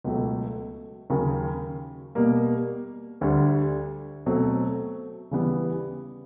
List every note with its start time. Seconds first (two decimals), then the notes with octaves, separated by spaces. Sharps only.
0.04 C#2 B2 F#3 A3
1.10 D#2 C#3 F#3
2.15 B2 G3 A#3
3.21 D2 D3 G3
4.26 B2 F#3 A3 C4
5.31 C#3 E3 G3 B3